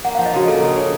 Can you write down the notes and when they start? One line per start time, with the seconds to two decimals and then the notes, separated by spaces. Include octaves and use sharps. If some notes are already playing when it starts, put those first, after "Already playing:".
0.04 A#3 F#5
0.15 F5
0.18 F3
0.26 D#5
0.33 C#3 F#4
0.48 A#3 A4
0.62 C#3
0.76 C#3